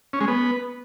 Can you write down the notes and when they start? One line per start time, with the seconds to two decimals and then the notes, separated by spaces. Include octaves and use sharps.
0.13 C#4
0.21 G#3
0.28 B3